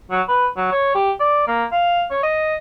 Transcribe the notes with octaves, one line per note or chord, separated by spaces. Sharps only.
F#3
B4
F#3
C#5
G4
D5
A#3
F5
C#5
D#5